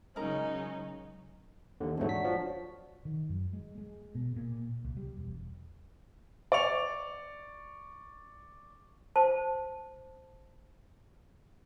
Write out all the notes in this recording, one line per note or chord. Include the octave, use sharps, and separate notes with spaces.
C#3 F#3 G#3 C#4 D#4 A#4 D#5 A#5
D#2 D3
E2 G#2 D3 F#3 A3
B6
F3 F#4
D#3
F#2
G#3
G#3
B2
A#2
C2
G3
E1
D5 C#6 F7
C5 A5